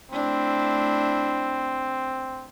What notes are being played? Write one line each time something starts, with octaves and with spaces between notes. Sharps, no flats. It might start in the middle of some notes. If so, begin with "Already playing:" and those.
A3 C4 D4 E4